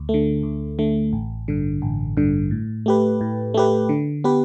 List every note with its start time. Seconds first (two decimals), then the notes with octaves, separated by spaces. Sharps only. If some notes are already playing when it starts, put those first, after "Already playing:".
Already playing: D2
0.09 A3
0.14 D3
0.43 D2
0.79 D3 A3
1.13 A1
1.48 G2 D3
1.82 A1
2.17 G2 D3
2.51 A2
2.86 A3 G4 B4
3.21 A2
3.54 A3 G4 B4
3.89 D3
4.24 B3 G4 B4